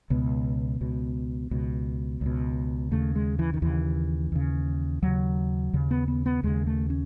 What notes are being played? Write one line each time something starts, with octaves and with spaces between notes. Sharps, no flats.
C#2 B2 B3
C#2 B2
C#2 B2
C#2 B2
D#2 C#3 A3
G#3
E3
D#3
D#2 C#3 E3
D#2 C#3
D#2 C#3 F#3
D#2 C#3
B3
B3
B3
D#2 C#3 G#3
A3
C#4